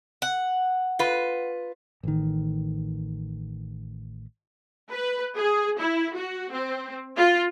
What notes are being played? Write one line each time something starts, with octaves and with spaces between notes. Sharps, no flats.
F#5
F4 B4
A1 D#3
B4
G#4
E4
F#4
C4
F4